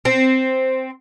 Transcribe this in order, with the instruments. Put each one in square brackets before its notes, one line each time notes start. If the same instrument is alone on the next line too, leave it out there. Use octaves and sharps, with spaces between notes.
[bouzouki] C4